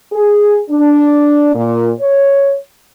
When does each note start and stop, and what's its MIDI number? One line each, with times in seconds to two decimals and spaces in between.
0.13 0.58 68
0.70 1.50 62
1.55 1.89 46
2.00 2.57 73